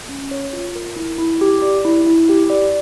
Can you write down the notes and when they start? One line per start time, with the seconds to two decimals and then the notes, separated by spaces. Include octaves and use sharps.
0.09 C#4
0.31 C#5
0.53 F4
0.75 A#4
0.96 E4
1.18 E4
1.41 G4
1.62 D5
1.85 E4
2.07 E4
2.29 G4
2.50 D5